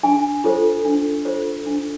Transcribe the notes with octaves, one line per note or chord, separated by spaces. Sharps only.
D4 G#5
F4 A4 C5
D4
F4 A4 C5
D4